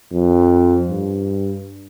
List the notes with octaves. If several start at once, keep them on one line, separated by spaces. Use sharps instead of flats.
F2
G2